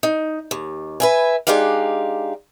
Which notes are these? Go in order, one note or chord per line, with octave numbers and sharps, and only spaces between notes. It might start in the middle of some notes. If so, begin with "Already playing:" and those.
D#4
D#2
B4 E5 G#5
G#3 D4 D#4 G4 F5